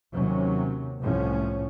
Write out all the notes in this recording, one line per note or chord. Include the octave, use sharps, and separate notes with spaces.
D#2 C3 F#3 C#4
C2 A2 F3 C#4